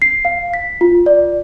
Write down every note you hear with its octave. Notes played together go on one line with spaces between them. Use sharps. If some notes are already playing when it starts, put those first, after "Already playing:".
C7
F5
B6
F4
D5